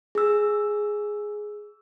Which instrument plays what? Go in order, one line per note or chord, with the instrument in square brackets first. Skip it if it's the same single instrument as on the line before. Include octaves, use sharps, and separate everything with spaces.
[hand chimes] G#4 E6